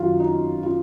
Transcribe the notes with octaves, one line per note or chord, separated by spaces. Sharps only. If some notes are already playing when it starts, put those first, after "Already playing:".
Already playing: F#2 D#3 F#3 F4 F#4
D#4
F4